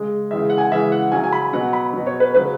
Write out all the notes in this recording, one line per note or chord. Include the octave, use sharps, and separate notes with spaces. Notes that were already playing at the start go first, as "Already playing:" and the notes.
Already playing: C#3 G#3
C#3 E3 G#3 E5
F#5
G#5
C#3 E3 G#3 E5
F#5
C#3 F#3 G#5
G#5
B5
B2 F#3 F#5
B5
B2 F#3
C#5
B4
C#3 F#3 B4